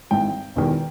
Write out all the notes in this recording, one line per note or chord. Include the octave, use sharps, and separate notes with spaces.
G#1 G#2 E3 G5
E1 E2 D#3